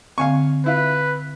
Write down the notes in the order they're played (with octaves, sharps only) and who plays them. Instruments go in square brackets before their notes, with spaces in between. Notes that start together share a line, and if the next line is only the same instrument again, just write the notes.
[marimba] D3 C4 [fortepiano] F5 G#5 C#6
[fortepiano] E4 F4 [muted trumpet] B4